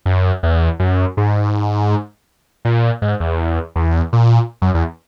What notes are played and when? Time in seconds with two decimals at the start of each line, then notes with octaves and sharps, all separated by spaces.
0.06 F#2
0.43 E2
0.79 F#2
1.17 G#2
2.65 A#2
3.02 G#2
3.20 E2
3.76 E2
4.13 A#2
4.62 F#2
4.74 E2